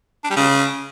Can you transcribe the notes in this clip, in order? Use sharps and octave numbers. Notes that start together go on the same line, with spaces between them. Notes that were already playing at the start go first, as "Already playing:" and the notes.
D4
G3
C#3